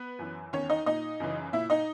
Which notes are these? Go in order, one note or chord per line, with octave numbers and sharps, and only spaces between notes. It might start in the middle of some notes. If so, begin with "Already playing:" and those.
Already playing: B3 B4
F#2 E3
E2 D#3 C#4 C#5
D#4 D#5
A#2 D#4 D#5
F#2 C#3 E3
A#2 E4 E5
D#4 D#5